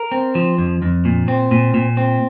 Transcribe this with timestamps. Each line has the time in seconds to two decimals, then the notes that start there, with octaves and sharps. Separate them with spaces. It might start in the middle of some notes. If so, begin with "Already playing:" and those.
Already playing: A#4
0.12 C4
0.35 F3
0.58 F2
0.82 F2
1.05 A#2
1.28 C4
1.51 A#2
1.74 A#2
1.97 C4